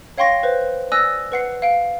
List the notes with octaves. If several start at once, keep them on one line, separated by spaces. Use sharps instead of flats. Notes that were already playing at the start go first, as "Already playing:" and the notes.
C#5 F5 G5 C6 C#6 A#6
B4 C5
D5 G#5 D#6 E6 F#6 A#6
B4 F#5 C7
F5 D7